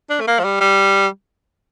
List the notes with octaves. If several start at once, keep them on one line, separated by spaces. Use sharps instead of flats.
D4
A3
A#3
F3
G3
G3